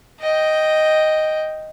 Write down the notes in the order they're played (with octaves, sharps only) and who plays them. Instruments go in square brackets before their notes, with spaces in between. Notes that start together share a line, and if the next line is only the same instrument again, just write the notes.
[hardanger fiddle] D#5 G5